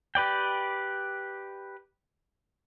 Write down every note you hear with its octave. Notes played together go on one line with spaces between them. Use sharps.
G4 B4 D5 G5